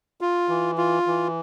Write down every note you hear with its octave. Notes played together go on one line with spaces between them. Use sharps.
F4
E3
F4
E3